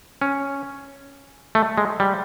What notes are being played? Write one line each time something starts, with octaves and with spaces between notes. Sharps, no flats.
C#4
A3
G#3
G3